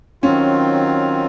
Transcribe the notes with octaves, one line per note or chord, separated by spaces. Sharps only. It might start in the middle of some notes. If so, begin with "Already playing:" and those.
D#3 F#3 C4 C#4 F4